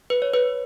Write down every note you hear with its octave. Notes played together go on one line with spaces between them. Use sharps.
B4
C#5
B4